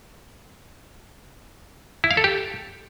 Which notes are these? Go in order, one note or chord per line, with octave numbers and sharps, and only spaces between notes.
E4
F5
A4
G4